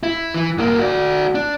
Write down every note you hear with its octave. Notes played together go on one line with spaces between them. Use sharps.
E4
E3
G2 A#3
F#4 D5
D4